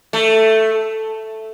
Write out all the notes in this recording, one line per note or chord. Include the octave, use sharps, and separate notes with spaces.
A3